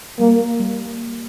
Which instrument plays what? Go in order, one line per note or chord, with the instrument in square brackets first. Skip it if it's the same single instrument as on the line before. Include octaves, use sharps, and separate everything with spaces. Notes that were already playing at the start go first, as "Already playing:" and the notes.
[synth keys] G3 [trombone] A#3
[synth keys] A#3
G3